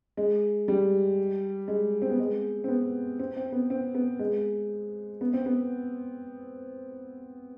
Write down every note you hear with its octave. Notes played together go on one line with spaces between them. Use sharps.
G#3
G3
G#3
C4
B3
G#3
C4
B3
C4
C4
B3
C4
B3
G#3
B3
C4
B3